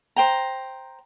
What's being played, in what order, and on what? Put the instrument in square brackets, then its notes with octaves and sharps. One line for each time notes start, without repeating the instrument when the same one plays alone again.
[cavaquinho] C5 G5 A#5